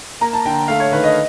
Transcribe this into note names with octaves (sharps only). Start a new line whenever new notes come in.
A#3 A#5
A5
D3 G5
A3 F5
C#5
D#3 B4
D#5